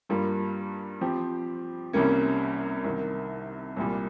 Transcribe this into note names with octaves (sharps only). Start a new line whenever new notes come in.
G2 G3 A#3 F4
F3 C4 G4
C2 C3 G3 A#3 C#4
C2 C3 D#3
C2 A#2 G3